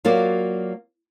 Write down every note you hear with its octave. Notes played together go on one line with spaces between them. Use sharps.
F#3 A#3 F4 F#4 D5